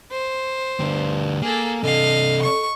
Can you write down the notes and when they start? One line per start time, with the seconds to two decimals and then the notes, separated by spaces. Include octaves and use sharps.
0.11 C5
0.80 D2 G2 G4
1.42 A#3 G#4 A4
1.83 C3 D4 A4 D#5 F5
2.42 C#6